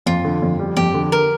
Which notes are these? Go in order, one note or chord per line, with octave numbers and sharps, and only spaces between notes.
F2 F4
D3
F2
G3
F2 G4
D3
A#4